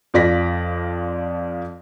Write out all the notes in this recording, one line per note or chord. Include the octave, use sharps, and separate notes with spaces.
F2 F3 D5 A#6 B6